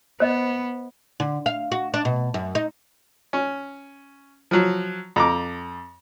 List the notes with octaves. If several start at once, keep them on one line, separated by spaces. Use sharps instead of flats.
B3 C5 D#5
D3
F5
F#4
D4
B2
F#2
D#4
C#4
F3 F#3
F2 A#5 D6